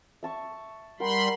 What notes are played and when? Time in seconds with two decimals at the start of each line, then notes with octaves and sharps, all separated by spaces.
0.23 E5 A5 C#6
1.00 G3 A#4 F#5 G5 B5 C6